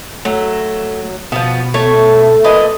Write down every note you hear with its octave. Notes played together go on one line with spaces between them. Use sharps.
F#3 A3
B2 F3 B3
A3 C#5
A#2 B4 D#5